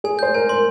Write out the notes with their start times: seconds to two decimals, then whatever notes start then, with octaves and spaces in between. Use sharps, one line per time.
0.04 G#4 G#5
0.19 C5 G6
0.34 A#4 G#5
0.49 A#4 C6